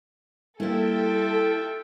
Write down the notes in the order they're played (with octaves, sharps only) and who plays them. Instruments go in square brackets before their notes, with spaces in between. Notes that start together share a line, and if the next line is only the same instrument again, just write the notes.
[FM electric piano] G3 A#3 [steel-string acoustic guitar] E4 G4 [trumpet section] F4 E5 G5 [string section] A4